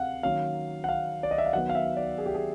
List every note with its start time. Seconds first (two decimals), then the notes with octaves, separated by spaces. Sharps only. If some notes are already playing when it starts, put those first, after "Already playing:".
Already playing: C3 F5 F#5
0.23 D#3 F#3 A#3 C#4 F5
0.84 F#5
0.89 F5
1.23 D5
1.31 D#5
1.38 E5
1.46 F5
1.53 D#3 F#3 B3 F#5
1.69 F5
1.75 E5
1.97 D5
2.18 G#4
2.26 G4
2.34 G#4